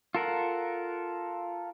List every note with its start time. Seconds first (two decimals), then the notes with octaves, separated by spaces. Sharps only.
0.15 F4 A4 A#4 F#5